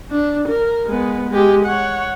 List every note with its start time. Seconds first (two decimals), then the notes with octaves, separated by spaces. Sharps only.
0.11 D4
0.48 A#4
0.86 G#3 B3
1.30 G#3 G4
1.65 C#5 F#5